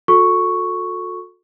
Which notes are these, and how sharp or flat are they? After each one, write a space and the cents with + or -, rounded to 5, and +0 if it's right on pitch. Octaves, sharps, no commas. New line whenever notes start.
F#4 -45 A4 +0 C#6 +0